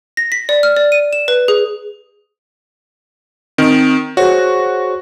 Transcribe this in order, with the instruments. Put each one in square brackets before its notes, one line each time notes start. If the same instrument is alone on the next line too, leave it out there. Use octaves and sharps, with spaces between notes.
[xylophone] A#6
B6
D5
F6
D5
D#7
E7
B4
G#4
[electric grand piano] D#3 [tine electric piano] C4
[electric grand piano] F#4 [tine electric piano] G#4 C5 C#5